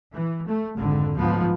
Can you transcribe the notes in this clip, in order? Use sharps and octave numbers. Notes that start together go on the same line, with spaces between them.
E3
A3
G#1 F2 D3
D2 G#2 F3 F#3 B3